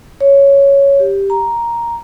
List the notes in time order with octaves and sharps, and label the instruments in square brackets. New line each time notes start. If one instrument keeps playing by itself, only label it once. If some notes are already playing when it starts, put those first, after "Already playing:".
[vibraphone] C#5
G4
A#5